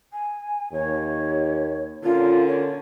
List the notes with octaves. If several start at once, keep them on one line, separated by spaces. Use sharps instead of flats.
G#5
D#2 C#5
A#2 D3 C#4 F4
C#5